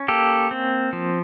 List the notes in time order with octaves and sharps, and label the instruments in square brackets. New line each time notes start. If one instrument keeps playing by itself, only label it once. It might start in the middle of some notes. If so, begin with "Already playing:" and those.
Already playing: [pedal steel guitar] C#4
A#3 G4 A4
C4
F3